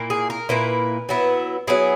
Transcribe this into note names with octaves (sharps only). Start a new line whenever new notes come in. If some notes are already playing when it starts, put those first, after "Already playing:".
Already playing: A#2 A#3 E4
G#4
A#4
A#2 A#3 E4 B4
F#3 B3 E4
F#3 B3 E4 G#4